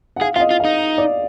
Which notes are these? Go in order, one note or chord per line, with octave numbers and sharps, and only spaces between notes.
F#5
G#4 F5
F4 F5
D#5
F4
F5
D#4
D5